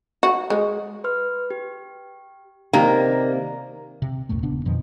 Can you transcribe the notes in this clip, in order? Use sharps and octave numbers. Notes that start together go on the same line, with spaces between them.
F#4
G#3
B4 C6 F6
G4
C3 D#3 A#3 D5 A#5
C3
C#2 F#2 A#2 A3
E1 C#3 B3 D4
F2 B2 D#3 F3